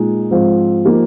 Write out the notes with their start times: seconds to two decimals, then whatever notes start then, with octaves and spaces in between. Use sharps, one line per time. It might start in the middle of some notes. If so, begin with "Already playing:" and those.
Already playing: A#2 G#3 D#4
0.31 G#2 F3 C4 F4
0.85 F3 A#3 D#4 G4